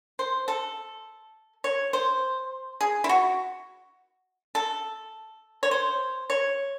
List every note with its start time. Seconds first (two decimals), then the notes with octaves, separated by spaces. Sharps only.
0.19 C5
0.48 A4
1.64 C#5
1.93 C5
2.81 G#4
3.04 E4
3.09 F#4
4.55 A4
5.63 C#5
5.71 C5
6.30 C#5